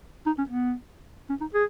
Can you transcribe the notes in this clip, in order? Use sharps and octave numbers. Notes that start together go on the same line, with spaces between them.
D#4
C#4
B3
C#4
D#4
G#4